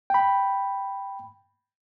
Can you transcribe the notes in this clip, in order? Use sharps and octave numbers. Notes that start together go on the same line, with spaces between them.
G5 B5